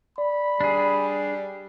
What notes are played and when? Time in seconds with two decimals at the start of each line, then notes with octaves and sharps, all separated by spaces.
0.18 D5 B5
0.61 G3 D4 G#4